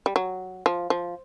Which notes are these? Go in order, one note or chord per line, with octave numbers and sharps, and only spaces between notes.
G3
F#3
F3
F3